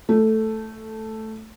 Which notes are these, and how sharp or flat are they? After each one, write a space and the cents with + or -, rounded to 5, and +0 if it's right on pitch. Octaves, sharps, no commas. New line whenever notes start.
A3 +0 E4 +0